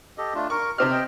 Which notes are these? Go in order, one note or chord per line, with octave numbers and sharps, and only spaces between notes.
G4 A4 D#5
A3 D4 F4
A#4 C#6
C3 C4 G4 D#5 F6
D#5 G5